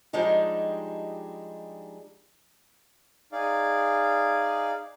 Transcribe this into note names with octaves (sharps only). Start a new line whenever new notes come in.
F3 G3 G#3 D4 D#4 G4
D#4 G#4 D5 F5